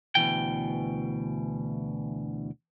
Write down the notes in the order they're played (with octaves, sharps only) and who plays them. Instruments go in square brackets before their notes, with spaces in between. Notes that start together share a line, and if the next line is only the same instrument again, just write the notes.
[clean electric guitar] D2 B2 E3 G5